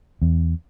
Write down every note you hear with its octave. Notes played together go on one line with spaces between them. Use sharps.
E2